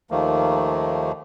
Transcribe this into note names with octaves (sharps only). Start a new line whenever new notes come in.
D#2 D#3 F3 A3 A#3